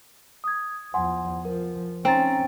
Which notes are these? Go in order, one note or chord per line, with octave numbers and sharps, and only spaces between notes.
D#6 G#6
E2 F3 F#5 G#5 C6
F3 A#4
C4 C#4 D#4 A#5 A6